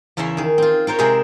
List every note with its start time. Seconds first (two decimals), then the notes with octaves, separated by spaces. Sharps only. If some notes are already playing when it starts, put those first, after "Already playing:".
0.17 E2 C#3 E4 C#5 E5 C6
0.37 D#3 G#4
0.58 C4 F4
0.87 F4 A#4 C5 C#5
0.98 C3 G#3 G#4 C5 E5 C6